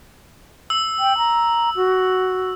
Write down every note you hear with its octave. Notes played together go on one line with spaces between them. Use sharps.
E6
G5
A#5
F#4